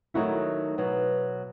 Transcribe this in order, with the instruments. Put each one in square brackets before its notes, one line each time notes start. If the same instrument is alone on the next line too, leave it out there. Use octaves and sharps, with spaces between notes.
[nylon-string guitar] D#3 F#3 A3 D#4 F#4 [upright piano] E4
[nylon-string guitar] B2 F#3 B3